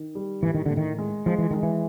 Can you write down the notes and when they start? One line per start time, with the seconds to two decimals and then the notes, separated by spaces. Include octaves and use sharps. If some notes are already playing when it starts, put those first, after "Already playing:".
Already playing: D#3
0.15 G3
0.42 A2 E3
0.55 D#3
0.66 A2 D3
0.77 D#3
0.98 G#3
1.26 F3 G#3
1.38 E3
1.51 D#3 G#3
1.63 E3